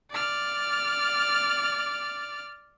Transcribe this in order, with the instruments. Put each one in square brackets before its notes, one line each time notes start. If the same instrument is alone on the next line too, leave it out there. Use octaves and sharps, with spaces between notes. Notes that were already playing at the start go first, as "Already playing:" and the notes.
[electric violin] D5 F6